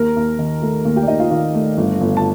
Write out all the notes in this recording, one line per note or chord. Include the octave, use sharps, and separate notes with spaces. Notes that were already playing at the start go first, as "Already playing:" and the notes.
Already playing: D#2 A#4 A#5
D#2
D#3
A3
D#2
G4 G5
D5
D#2 D#4 D#5
F4 F5
D#3 F4 F5
A3
G1
G1
A5